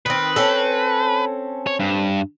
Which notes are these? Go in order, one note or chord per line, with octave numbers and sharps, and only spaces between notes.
D#3 C4 B4
C4 C#4 A4
C#5
G2